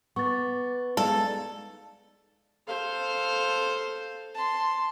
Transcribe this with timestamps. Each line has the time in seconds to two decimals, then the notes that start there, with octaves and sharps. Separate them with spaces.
0.16 B3 C#6 D6 A6
0.97 G#3 D#4 A4 D5 F5
2.67 A4 C5 F5
4.35 A5 C6